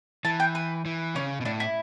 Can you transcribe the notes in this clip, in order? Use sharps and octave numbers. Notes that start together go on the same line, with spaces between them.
E3 A5
G5
B4
E3
C#3 C#4
B2
A2 D4
E4